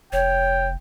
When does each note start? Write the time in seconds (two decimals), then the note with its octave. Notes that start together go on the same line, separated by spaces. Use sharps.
0.13 F1 C#5 G5